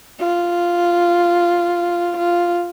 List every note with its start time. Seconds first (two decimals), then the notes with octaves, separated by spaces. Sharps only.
0.19 F4
2.17 F4